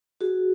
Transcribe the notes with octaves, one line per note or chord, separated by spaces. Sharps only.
F#4 G#4